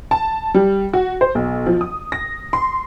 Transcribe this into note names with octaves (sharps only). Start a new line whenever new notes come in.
A5
G3
F#4
C5
B1
F3
D#6
A#6
C6